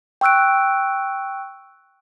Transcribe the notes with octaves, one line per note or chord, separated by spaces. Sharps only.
G5 C#6 E6 F#6 D7